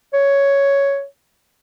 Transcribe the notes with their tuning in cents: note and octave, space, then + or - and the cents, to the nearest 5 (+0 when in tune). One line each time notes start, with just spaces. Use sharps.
C#5 +5